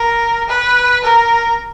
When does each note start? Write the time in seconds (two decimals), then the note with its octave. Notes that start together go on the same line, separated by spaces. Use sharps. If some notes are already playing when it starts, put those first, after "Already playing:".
Already playing: A#4
0.48 B4
1.04 A#4